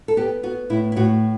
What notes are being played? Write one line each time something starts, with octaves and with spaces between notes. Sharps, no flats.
A4
B3 G4
B3 F#4
A2 E4
E4
A2 F#4